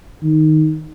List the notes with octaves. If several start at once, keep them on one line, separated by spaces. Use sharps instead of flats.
D#3